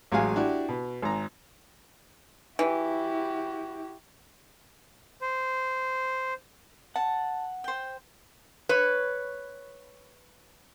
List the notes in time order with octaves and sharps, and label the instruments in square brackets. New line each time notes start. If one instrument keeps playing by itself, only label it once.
[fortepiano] A1 F#3 G#3 G#4 F5 G#5
D4 E4 F#4 G4
B2
G#1 A#5
[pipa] E3 [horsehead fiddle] E4 [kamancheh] F#4 G4
[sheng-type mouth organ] C5
[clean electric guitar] F#5 [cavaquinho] A5
[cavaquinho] C5 G5
[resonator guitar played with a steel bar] B4 C#5